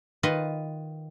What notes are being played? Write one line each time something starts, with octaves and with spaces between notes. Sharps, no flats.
D#3 F4 B4 D#5